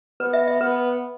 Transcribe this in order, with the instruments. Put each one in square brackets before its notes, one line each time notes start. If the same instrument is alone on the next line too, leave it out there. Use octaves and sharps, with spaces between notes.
[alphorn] B3 [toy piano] B4
[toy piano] E5
E5
[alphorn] B3 [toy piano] B4